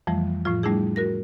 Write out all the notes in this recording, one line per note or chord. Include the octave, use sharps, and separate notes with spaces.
F2 E3 F3 G3 A3
A2 F3 F4
G3 A3 D4 E4 G#4
F#4 A#4 A#6